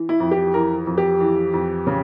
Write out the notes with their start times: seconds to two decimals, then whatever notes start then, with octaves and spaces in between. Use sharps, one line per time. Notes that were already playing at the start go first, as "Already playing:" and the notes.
Already playing: E3
0.09 E4
0.20 F2
0.31 G4
0.54 E3 A#4
0.87 F2
0.98 G4
1.20 E3
1.54 F2
1.87 C#3